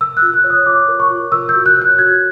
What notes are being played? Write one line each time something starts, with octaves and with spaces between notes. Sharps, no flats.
A#4 E6
F#6
F4
F#6
C#5
D#6
F4 D6
A#4
C#6
F4
A#4 E6
G6
F#4
F#6
C#5
G6
F#4 G#6